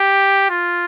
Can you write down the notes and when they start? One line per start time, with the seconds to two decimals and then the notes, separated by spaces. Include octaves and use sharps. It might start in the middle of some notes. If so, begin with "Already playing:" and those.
Already playing: G4
0.50 F4